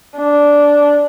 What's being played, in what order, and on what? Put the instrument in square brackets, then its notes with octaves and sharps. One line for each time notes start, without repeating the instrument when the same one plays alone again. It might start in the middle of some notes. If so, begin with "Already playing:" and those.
[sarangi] D4